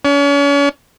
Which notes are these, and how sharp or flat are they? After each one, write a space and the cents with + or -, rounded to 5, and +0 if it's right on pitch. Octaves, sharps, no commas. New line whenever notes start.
C#4 +40